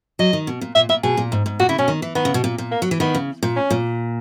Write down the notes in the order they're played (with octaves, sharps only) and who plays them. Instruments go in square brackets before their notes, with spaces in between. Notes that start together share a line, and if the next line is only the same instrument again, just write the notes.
[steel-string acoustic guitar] F#3 [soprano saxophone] D#5
[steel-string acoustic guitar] D#3
B2
A#2
[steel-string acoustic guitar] A#2 [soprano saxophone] E5
[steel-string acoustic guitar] A#2 [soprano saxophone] E5
[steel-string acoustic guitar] B2 [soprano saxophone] G#4
[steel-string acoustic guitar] A#2
G#2
G#2
[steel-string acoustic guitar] A#2 [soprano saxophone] F#4
[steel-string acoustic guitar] C#3 [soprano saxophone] E4
[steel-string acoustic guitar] B2 [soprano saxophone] C#4
[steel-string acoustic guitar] D#3
E3
[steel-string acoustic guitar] D#3 [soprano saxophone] B3
[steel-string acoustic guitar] C#3
B2
A#2
A#2
[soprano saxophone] A#3
[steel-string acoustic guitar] F#3
E3
[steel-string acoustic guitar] D#3 [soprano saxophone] B3
[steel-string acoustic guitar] C#3
A#2
[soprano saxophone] C#4
[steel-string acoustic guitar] A#2